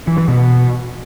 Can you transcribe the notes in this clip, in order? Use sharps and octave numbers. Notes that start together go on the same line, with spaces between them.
E3
E3
B2